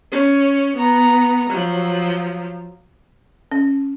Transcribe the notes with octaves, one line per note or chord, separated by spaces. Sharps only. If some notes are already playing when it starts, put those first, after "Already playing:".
C#4
B3 A#5
F3 F#3
C#4